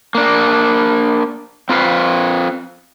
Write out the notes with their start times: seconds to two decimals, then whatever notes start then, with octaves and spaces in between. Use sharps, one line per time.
0.15 A#3 D4
1.69 C4 F4 B4 F5